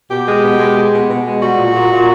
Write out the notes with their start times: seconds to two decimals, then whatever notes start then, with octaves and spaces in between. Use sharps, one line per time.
0.10 B2 G4
0.27 G#3
0.43 B2
0.59 G#3
0.76 G#3
0.93 B2
1.09 B2
1.25 G#3
1.41 G3 F#4
1.58 A#2
1.74 A#2
1.91 A#2